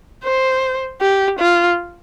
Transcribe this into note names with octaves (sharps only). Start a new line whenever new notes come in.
C5
G4
F4